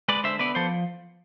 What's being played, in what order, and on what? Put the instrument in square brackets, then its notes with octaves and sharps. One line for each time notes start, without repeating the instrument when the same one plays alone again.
[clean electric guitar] G#3 B4 D5
D3 C5 E5
B3 B4 D5
F3 A4 C5